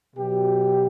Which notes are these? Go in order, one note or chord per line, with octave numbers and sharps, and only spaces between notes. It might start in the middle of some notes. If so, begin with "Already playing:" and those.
B2 F#3 G4